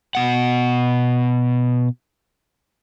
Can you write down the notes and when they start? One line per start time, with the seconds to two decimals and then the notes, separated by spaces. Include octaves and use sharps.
0.15 B2 F#5